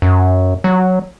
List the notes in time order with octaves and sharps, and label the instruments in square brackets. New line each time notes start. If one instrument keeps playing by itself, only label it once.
[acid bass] F#2
F#3